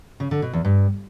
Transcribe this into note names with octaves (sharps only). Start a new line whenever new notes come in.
C#3
D3
B2
E2
G2